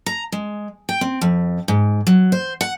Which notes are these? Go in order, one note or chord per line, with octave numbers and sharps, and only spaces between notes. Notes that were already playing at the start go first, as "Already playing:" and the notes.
A#5
G#3
G5
C4
F2
G#2
F#3
C5
F#5